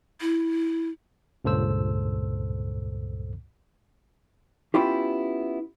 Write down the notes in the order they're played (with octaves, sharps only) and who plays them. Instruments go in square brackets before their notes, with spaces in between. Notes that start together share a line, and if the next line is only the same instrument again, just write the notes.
[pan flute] E4
[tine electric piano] C#2 G2 A#2 A4 C5 E6
[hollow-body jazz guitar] B3 C#4 E4 F4 G4